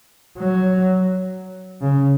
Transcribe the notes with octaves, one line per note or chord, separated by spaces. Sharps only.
F#3
C#3